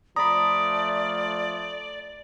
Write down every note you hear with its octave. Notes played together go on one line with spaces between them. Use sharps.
F3 A3 D5 A#5 B5 D#6